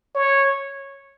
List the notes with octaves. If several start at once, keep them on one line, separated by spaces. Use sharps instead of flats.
C#5